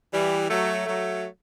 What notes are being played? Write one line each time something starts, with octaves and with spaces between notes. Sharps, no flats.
E3 G3
F#3 A3
F#3 A3